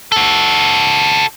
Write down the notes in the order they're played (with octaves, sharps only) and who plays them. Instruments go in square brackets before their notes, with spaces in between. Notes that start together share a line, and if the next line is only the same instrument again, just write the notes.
[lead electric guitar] F#4 A4